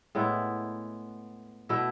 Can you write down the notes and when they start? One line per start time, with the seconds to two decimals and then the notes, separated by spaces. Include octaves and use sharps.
0.15 A2 G#3 B3 E4
1.69 B2 A3 E4